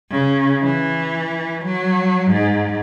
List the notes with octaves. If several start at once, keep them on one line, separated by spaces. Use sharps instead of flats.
C#3
E3
F#3
G#2